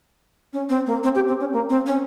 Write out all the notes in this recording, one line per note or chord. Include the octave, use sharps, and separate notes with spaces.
C#4
C4
A#3
C4
G4
C4
C#4
A#3
C4
C#4